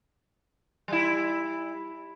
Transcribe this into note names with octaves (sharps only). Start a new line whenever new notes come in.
G3 E4